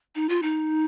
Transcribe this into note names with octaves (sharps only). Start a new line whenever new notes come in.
D#4
F4
D#4